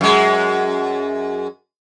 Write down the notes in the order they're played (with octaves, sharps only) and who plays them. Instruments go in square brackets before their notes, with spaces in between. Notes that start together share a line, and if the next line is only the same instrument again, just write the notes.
[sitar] F#2 G#3